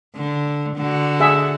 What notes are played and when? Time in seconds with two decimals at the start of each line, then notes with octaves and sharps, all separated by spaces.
0.16 D3
0.77 D3 F#4
1.20 G#4 E5